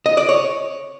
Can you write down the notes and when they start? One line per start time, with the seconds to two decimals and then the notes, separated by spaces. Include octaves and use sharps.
0.06 D#5
0.17 D5
0.29 C#5